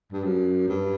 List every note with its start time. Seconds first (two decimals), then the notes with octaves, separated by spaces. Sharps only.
0.12 G2
0.24 F#2
0.68 G2